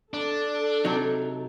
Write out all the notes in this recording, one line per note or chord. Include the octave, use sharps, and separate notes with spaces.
D4 A4
C3 F#3 D#4